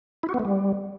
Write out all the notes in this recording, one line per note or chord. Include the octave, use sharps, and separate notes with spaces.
E4
F#4
B3
A3
G3